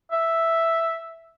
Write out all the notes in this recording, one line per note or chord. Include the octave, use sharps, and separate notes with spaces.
E5